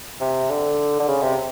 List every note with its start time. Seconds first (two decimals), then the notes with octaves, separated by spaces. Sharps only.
0.20 C3
0.50 D3
0.99 D3
1.08 C#3
1.22 C3